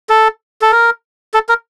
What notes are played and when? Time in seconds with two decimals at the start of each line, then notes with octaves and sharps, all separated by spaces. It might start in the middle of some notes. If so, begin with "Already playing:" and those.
0.09 A4
0.62 A4
0.72 A#4
1.34 A4
1.49 A#4